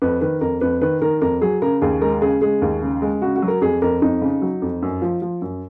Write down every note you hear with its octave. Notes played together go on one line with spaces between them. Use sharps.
F2 B4
D#3 B4
F2 A#4
F2 B4
D#3 B4
D#3 A#4
F2 A#4
F#3 G#4
C#3 A#4
D#2 G#4
G#3 A#4
C#3 G#4
G#3 G#4
D#2
C#3
G#3
C#3 F#4
F#4
F#3
A#4
F2 G#4
F2 A#4
F2 D#4
C#3
F#3
F2
F#2
F3
F3
F#2